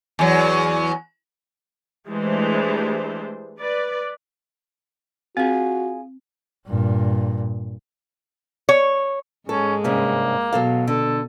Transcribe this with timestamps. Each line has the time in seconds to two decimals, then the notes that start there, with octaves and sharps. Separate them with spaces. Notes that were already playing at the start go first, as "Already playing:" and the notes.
0.19 E2 F#3
2.09 E3 G#3 A3 D4 G4 C5
3.60 B4 D5
5.37 C4 F4 F#4 G#4
6.67 G2 A#2
8.69 C#5
9.49 G#2 G#3 C#4 A4
9.84 G2 C3 A#3 C#4
10.53 B2 F#3 A4 F5
10.88 D3 A4